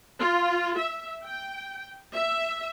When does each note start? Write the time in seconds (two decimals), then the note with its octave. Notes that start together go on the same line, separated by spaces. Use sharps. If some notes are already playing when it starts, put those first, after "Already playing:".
0.19 F4
0.78 E5
1.25 G5
2.15 E5